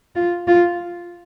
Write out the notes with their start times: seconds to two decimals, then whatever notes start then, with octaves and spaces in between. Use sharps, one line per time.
0.16 F4
0.48 F4